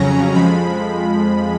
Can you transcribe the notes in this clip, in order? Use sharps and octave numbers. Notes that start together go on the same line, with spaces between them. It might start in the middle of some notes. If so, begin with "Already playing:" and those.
Already playing: F2 C#3 F#3 C#4 A#5
F2 F3 G#3 B5